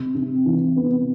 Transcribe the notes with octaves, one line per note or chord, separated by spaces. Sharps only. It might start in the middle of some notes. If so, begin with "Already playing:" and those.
Already playing: C3
C3
E3
B3